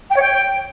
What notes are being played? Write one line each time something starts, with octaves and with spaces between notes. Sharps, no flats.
G5
C#5
G5